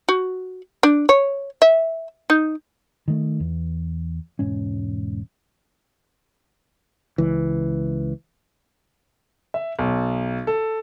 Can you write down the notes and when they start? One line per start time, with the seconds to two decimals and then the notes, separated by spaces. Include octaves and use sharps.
0.09 F#4
0.83 D4
1.09 C#5
1.62 E5
2.30 D#4
3.08 D#3 A3
3.40 E2
4.39 E1 G#2 C#4
7.18 C#2 E3
9.54 E5
9.79 B1
10.47 A4